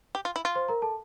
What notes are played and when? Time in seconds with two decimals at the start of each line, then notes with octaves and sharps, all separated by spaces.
0.15 G4
0.25 F4
0.36 E4
0.45 F4
0.55 C5 C6
0.68 A#4 A#5
0.82 A4 A5